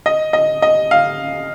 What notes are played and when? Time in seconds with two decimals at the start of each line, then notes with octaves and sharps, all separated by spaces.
0.06 D#5
0.33 D#5
0.62 D#5
0.91 F5